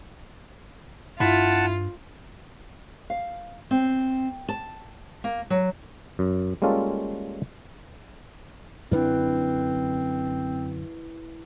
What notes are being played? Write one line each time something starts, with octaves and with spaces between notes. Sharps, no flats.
G2 E4 F4 F#5 A5
F5
C4
A5
A#3
F#3
F#2
G3 G#3 A#3 C#4 F4 A4
F#2 D3 C4 D4 E4 B4